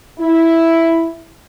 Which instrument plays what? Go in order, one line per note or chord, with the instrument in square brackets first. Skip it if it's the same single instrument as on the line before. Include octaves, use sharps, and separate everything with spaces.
[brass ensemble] E4